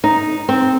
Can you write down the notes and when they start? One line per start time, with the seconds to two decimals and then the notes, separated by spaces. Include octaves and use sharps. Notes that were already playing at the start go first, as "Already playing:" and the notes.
0.04 D#4
0.49 C4